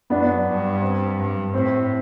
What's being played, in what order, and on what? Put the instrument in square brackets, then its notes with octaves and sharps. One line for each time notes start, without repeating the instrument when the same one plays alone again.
[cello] F#2 [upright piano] B3 D4
[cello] G2
[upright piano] C4
[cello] G2
[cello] A2 [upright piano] C4